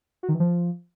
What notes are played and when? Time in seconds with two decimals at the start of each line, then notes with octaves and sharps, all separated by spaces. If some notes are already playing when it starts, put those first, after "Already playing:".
0.23 F#4
0.29 D#3
0.34 E3
0.40 F3